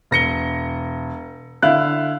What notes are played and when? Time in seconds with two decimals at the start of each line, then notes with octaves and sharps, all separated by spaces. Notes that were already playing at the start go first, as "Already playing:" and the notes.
0.11 E1 A#6 C#7 G7
1.62 D3 E4 F5 F#6